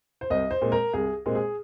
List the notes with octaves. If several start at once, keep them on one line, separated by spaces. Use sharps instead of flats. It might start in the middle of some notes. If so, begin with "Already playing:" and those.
C5
C2 D#5
C5
A#2 G#3 C4
A#4
C2 G#4
A#2 G#3 C4
G#4